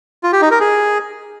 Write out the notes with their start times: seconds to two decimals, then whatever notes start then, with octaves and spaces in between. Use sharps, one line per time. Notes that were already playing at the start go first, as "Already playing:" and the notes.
0.24 F4
0.33 G4
0.42 D#4
0.51 A#4
0.60 G#4